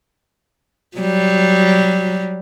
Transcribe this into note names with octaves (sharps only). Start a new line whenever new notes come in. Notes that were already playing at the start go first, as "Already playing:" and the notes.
F#3 G3